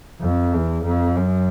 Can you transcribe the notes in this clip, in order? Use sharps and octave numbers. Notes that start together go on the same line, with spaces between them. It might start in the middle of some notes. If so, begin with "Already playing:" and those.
F2
E2
F2
F#2